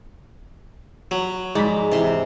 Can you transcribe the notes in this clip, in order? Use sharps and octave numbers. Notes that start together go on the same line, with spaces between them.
F#3 B5
G#2 F3 G#3 D5 B5
C3 E3 E4 C6